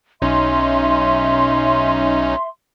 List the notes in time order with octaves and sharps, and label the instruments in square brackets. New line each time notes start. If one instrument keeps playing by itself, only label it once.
[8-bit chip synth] B1 C#4 D#4 [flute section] E5 C6